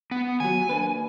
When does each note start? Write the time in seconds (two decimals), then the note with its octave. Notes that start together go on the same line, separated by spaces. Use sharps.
0.11 B3
0.40 D#2 F#3 G#5
0.69 A#3 D4 B4